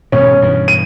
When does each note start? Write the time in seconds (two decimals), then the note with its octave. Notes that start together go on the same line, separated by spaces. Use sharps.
0.12 E1 G#2 B2 C#4
0.42 G2 B2 E3
0.68 D#7